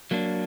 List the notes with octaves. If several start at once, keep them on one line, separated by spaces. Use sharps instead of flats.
F#3 A#3 D4